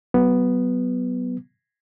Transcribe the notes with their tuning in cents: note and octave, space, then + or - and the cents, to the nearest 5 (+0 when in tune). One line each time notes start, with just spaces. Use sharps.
F#3 +25 B3 +0